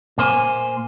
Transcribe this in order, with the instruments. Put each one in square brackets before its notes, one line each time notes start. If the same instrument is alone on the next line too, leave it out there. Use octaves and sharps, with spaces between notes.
[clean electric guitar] A#2 A#3 C5 G#5